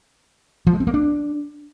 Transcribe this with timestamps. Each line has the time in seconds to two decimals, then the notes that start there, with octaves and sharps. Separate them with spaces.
0.67 F3
0.73 G#3
0.80 C4
0.87 A#3
0.94 D4